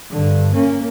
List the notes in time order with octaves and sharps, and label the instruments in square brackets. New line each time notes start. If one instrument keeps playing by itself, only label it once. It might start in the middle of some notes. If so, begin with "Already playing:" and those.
[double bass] G2 D3
A#3 C#4